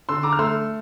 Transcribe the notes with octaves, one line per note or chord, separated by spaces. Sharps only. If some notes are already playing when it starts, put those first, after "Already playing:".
D3 C6 E6
A#5 D6
F6
A3 C6 E6